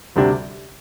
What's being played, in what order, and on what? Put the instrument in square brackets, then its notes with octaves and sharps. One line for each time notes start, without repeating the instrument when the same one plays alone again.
[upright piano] D2 C3 G3 D4